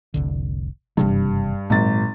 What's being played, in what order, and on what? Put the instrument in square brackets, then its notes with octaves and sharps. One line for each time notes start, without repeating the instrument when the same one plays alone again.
[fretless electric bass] F1 C2 D3
[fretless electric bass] F#1 C3 E3 [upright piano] G2
[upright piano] G#1 A6 [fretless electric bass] A#2 F#3